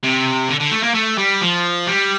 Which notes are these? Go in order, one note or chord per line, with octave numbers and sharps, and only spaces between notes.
C3
D3
D3
A3
A#3
A3
G3
F3
G3